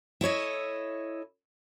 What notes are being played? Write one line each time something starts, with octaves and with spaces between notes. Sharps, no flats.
E4 A4 C#5 D#5